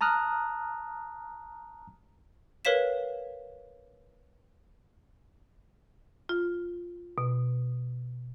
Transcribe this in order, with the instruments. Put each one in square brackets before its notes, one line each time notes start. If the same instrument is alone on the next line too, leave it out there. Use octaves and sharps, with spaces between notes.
[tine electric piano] A5 A#5 D#6 F6 F#6
[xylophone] A#4 B4 C#5 F5 B6 E7
[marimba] F4
B2